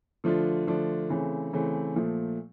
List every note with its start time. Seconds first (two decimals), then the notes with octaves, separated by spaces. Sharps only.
0.24 D3 F3 A3 D4 F4
0.67 D3 F3 A3 D4 F4
1.10 C#3 E3 A3 C4
1.53 C#3 E3 A3 C4
1.96 A#2 F3 A3